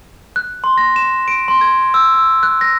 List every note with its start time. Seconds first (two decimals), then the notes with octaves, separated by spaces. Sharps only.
0.36 F#6
0.64 C6
0.78 A#6
0.96 E7
1.28 D7
1.48 C6
1.61 G#6
1.94 E6
2.15 E6
2.43 F#6
2.61 A#6